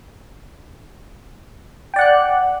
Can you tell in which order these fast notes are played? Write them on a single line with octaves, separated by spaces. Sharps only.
G5 D5 F#5 F#6